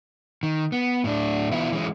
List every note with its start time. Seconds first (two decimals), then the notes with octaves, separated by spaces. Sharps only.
0.43 D#3
0.72 B3
1.04 A2 D4
1.51 E3 B3 E4 F4
1.72 E3 G#3 C#4